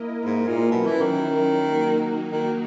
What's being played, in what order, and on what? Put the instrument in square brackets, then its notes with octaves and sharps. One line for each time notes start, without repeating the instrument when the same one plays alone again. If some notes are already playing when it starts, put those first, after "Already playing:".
Already playing: [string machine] A#3 E4 A#4 D#5
[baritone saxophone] G#2
A#2
[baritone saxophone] B2 [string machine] F#3 C#4 E4 A#4
[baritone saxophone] E3
D#3
[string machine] F#3 A#3 D#4 F#4
[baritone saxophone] D#3